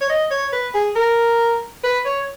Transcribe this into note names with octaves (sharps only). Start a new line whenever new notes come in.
C#5
D#5
C#5
B4
G#4
A#4
B4
C#5